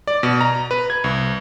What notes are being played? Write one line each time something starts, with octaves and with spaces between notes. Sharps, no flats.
D5
B2
A#5
B4
G#6
C2